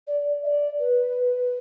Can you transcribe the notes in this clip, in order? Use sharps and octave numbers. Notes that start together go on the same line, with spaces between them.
D5
E5
D5
B4